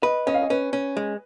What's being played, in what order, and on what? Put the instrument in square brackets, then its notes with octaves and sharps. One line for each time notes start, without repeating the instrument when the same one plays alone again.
[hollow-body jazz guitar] B4 [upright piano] D#5
[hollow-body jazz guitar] C#4 [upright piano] D#5
[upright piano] F5
D#5
[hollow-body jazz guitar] C#4 [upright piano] B4
[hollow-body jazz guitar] C#4
G#3